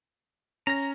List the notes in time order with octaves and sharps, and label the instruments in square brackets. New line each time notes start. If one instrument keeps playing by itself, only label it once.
[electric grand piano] C#4 A#6 [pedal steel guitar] A#5